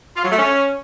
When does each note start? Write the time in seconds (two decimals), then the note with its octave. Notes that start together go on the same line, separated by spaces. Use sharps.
0.16 F4
0.24 F#3
0.31 A3
0.39 C#4